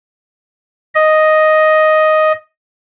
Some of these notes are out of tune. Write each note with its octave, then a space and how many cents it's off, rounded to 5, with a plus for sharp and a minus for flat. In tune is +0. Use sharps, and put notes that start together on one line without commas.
D#5 +0